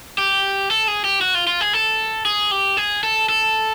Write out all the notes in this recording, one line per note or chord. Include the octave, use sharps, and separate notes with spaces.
G4
A4
G#4
G4
F#4
F4
F4
G#4
A4
G#4
G4
G#4
A4
A4